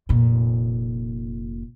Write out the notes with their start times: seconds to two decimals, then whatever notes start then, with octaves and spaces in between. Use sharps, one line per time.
0.09 F1 A#2